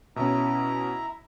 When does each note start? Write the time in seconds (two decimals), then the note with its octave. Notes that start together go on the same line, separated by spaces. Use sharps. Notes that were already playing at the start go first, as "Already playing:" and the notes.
0.16 B2 C#4 E4 E5 A#5